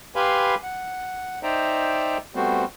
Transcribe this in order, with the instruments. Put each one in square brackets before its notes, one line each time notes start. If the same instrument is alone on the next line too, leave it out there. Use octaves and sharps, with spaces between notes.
[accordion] G4 B4 F5 G#5 B5 C6
F#5
D#4 C5 D5 E5 G5 A#5
G3 A3 B3 C4 F#4 C5